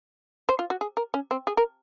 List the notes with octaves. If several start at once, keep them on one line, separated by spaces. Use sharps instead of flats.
C5
F4
F#4
G#4
A#4
C#4
C4
G#4
A#4